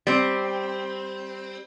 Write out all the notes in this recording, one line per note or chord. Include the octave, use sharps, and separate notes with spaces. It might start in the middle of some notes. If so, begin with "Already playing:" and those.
G3 C4